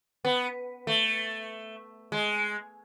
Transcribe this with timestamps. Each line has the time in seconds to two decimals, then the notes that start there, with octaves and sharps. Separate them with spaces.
0.25 B3
0.87 A3
2.12 G#3